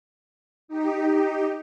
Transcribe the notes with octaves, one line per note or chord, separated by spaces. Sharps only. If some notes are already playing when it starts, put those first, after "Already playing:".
D#4 G4